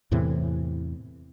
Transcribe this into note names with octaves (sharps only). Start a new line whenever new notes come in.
E2 A2 C3 E3